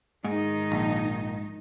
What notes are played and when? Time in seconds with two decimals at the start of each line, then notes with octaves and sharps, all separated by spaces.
0.24 G#2 D#3 D#4
0.72 A#1